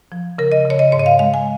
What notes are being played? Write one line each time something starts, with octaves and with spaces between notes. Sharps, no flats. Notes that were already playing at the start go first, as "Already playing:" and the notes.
F3
C#3 A#4
D#5
C#3 C#5
D#5
G#2 C#5
D#5
F5
G#3 F5
G#5